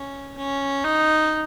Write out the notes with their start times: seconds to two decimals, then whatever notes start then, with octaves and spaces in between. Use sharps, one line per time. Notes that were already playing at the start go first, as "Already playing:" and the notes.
Already playing: C#4
0.38 C#4
0.84 D#4